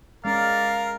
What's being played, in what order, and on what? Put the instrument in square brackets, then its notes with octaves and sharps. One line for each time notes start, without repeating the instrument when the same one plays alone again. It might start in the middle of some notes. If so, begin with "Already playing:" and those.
[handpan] G#3 C#4 [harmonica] A#4 [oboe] D5 [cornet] F5